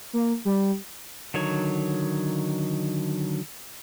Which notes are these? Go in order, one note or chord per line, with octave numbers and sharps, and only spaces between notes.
A#3
G3
D3 D#3 F#3 C#5